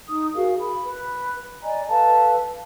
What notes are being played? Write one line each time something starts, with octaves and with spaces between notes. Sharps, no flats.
D#4 D#6
F#4 G#4 A#4 F5
B5
B4
D5 D#5 G#5 A#5
A4 B4 F5 A5